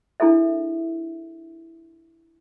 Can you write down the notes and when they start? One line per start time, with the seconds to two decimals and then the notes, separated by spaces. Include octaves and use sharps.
0.20 D4 E4 G#4 A4 E5